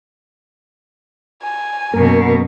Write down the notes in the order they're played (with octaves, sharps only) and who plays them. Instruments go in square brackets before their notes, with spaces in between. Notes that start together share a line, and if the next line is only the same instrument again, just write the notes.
[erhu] G#5
[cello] F#2 B2 [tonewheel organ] A#3 A#4